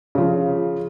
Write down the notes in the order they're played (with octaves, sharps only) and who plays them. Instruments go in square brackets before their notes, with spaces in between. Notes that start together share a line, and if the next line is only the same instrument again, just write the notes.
[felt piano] C#3 F3